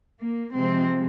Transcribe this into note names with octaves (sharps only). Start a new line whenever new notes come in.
A#3
C3 F3 G#3 C4